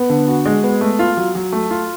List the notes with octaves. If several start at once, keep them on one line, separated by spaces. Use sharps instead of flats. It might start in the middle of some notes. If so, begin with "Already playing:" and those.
Already playing: B3
D3
F#4
G#3
B3
A3
F4
F#3
F#3
A3
F4